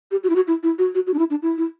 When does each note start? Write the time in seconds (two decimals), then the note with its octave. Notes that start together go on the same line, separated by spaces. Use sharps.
0.11 G4
0.24 F#4
0.30 E4
0.36 F#4
0.47 E4
0.63 E4
0.79 F#4
0.95 F#4
1.07 F#4
1.14 D4
1.19 E4
1.30 D4
1.42 E4
1.58 E4